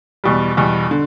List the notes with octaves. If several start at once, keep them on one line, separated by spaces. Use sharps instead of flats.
E2 B2 G3
E2 B2 G3
D3